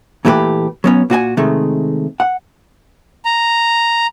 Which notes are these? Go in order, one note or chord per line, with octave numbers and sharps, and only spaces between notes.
A#2 E3 A3 F#4 G4 B4
F#3 B3 C#4
A#2 F#4 D5 G#5
C3 D#3 G#3 A3
F#5
A#5